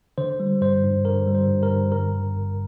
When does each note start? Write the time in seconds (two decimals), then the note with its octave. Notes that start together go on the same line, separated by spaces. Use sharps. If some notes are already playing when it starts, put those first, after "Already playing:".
0.18 D3 C5
0.40 G3
0.61 G2 C5
0.84 G2
1.05 D3 A#4
1.27 G3
1.35 C5
1.48 G2
1.63 A#4
1.70 G2
1.92 G2 A#4
2.14 D3
2.36 G1